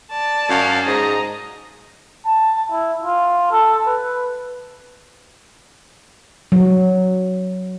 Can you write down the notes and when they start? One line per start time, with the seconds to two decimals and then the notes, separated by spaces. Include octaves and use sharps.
0.11 D5 A5
0.50 F#2 F5
0.86 G#2 D#5 A#5
2.26 A5
2.72 E4
3.03 F4
3.51 A4
3.87 B4
6.52 F#3